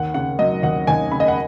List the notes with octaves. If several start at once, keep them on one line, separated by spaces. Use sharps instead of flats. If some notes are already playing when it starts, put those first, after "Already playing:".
Already playing: D#2 F#5
C#3 F#5
F#3 D#5
D#2 F#5
D#2 G#5
C#3 B5
D#5
F#5